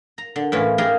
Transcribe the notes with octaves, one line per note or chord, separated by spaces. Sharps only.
A#5
D3
A2 E3 C#4 F4
F4 G4 G#4 A#4 D#5 G5